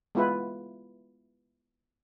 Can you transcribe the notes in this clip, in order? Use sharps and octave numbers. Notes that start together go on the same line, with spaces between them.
G#3 B3 E4 F4 B4